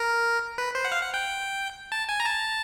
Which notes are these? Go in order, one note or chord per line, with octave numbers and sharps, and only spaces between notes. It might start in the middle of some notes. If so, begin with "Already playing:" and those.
Already playing: A#4
B4
C5
F#5
F5
F#5
G5
A5
G#5
A#5
A5